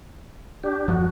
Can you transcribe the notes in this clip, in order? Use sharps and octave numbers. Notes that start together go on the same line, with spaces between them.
D4 G4
D#1 F#2 F3 F#4